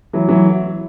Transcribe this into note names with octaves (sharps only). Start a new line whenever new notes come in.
E3 F#3
E3 F#3